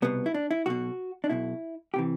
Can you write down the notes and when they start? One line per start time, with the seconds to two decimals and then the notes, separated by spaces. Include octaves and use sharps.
0.02 C2 B2 B3
0.26 E4
0.34 D4
0.51 E4
0.66 B1 B2 F#4
1.24 D4
1.29 B1 B2 E4
1.94 C3 E3 G4